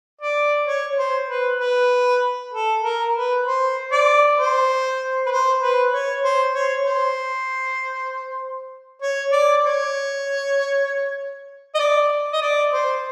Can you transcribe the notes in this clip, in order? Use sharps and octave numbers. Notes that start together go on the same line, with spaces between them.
D5
C#5
C5
B4
B4
A4
A#4
B4
C5
D5
C5
B4
C5
B4
C#5
C5
C#5
C5
C#5
D5
C#5
D#5
D5
D#5
D5
C5